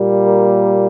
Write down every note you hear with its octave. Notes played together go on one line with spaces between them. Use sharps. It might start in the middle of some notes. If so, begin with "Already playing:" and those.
Already playing: A#2 G3 A#3
A#4